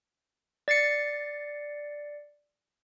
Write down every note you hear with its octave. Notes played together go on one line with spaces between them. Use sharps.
D5 A6 C7 C#7